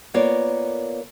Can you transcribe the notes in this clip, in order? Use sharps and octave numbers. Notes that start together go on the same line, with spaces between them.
A#3 B3 F4 A#4 C#5 D5